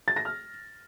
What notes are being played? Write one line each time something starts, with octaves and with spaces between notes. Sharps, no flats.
A6
A#6
F6